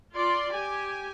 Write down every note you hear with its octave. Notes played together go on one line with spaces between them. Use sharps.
F4 D5 C6
G4 G#5